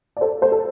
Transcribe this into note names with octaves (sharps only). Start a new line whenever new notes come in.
D5
A4 C5
A4 C5
A4